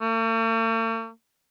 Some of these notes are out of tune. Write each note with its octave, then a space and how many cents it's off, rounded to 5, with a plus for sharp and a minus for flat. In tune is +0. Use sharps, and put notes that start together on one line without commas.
A3 +45